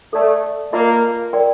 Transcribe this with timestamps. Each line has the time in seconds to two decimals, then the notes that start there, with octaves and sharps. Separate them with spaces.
0.13 A3 A4 D5 A5
0.73 A#3 F4 A#4 D#5 A5 C6
1.33 A#4 D5 G5 C6